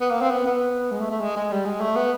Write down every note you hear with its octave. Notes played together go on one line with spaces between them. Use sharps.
B3
A#3
C4
B3
B3
G#3
A3
A3
G#3
G#3
G3
G#3
A3
B3